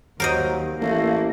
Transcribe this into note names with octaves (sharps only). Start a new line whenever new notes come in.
D#2 F#3 A#4 C5 D#5
A1 A3 A#3